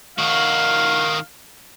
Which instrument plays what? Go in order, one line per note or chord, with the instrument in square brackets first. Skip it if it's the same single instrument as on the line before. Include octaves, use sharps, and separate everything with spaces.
[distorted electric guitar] D#3 F#4 [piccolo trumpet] F5